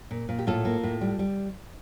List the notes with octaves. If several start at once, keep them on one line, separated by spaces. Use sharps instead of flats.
A#2
A#2
G4
A2 F4 A4
A#3
A2
G3
G3